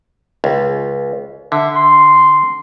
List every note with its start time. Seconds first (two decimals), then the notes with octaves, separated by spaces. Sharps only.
0.44 C#2
1.52 D3 E5
1.75 C6